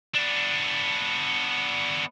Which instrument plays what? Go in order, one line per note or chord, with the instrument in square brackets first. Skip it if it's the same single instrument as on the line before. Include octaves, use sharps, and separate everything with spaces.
[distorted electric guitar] B3 D4